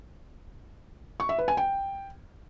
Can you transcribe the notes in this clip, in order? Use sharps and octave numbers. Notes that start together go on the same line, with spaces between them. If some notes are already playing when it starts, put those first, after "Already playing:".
C#6
E5
B4
G#5
G5